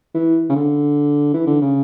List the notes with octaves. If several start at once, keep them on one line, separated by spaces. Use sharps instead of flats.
E3
C#3
D3
E3
D3
C#3